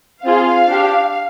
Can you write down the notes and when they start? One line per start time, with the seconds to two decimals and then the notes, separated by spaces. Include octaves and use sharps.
0.23 C4 F4 G#4 F5
0.68 D4 G4